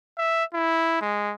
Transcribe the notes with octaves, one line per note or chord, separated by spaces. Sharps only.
E5
E4
G#3